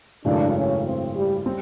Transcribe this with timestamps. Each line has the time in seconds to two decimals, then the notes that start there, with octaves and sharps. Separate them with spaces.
0.25 G#1 F#2 C#3 E3 A3 D4
0.55 C#4
0.85 C4
1.16 G3
1.46 G3 C4